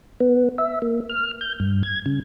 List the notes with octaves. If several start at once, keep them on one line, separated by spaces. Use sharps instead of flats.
B3
E5
A#3
F6
G6
G2
G#6
C#3